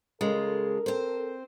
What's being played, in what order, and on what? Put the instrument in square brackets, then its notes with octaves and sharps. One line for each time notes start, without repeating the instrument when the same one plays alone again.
[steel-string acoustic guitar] C#3 G#3 F4 [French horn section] A4 A#4
[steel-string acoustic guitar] C4 C5